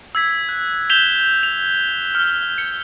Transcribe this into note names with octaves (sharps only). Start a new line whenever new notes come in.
E6 G#6 B6
F#6
F#6 G6 B6 E7 F7 G7
F7
F6
C#7